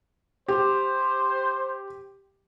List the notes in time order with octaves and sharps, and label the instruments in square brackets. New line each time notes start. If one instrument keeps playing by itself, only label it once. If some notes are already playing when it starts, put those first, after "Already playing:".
[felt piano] G4 [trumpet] C5